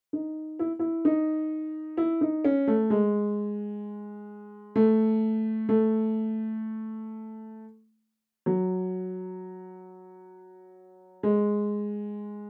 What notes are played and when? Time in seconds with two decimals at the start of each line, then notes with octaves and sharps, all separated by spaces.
0.13 D#4
0.59 E4
0.79 E4
1.05 D#4
1.97 E4
2.21 D#4
2.44 C#4
2.68 A3
2.90 G#3
4.76 A3
5.69 A3
8.46 F#3
11.23 G#3